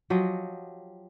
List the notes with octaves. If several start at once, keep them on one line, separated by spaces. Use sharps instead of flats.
F3 F#3 G4 D#5